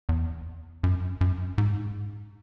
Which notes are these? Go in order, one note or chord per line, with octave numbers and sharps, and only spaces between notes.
E2
F#2
F#2
G#2